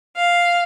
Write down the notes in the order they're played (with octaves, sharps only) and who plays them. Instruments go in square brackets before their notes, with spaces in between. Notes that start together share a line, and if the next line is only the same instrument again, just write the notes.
[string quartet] F5